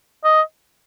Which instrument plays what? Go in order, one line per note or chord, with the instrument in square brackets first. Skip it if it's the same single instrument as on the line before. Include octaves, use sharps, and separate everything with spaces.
[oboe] D#5